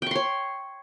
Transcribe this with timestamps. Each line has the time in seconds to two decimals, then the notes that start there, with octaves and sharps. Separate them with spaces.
0.02 G5
0.07 C#6
0.11 C6
0.15 C#5